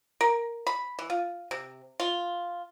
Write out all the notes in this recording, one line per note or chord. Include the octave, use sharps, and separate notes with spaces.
A#4
B5
E3
F4
C3
F4